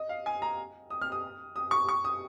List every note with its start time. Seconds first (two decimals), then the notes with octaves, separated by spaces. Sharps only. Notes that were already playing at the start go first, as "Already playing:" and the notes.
Already playing: D#5
0.09 F5
0.26 G#5
0.42 A#5
0.90 D#6
1.01 F6
1.12 D#6
1.56 D#6
1.71 C#6
1.89 C#6
2.05 D#6